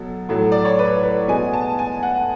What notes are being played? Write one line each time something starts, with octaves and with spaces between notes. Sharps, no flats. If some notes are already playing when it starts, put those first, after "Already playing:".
Already playing: B2 F#3 A4
A2 F#3 A3
D5
C#5
B4
B4
B2 G#3 B3 G#5
A5
G#5
F#5